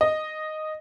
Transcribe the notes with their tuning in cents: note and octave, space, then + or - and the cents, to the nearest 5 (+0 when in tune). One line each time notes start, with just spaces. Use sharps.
D#5 -5